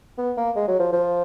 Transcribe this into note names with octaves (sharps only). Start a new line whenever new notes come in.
B3
A#3
G#3
F#3
F3
F3